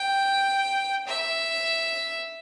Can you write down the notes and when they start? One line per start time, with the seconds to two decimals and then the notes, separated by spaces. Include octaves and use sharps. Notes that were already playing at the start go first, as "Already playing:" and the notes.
Already playing: G5
1.07 E5